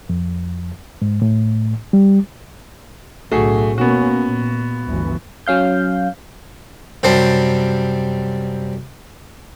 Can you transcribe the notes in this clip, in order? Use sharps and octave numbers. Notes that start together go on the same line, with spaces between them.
F2
G#2
A2
G3
B1 A2 D3 A3 F#4 G#4
B2 A#3 B3 C#4 F#4
A#2
G1 D2 E3
F#3 C#4 F5 G6
F#2 C3 G3 C5 A5